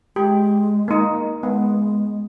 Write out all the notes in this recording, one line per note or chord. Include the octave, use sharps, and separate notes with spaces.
G#3 G4
A#3 D#4
G#3 B3